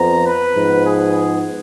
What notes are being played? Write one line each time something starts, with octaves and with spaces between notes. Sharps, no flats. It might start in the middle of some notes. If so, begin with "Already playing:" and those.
Already playing: F2 F3 B3 A#5
B4
G#2 F3 B3
G#4